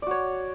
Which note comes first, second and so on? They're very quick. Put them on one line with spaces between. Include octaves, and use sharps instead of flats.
D5 F#4 C#5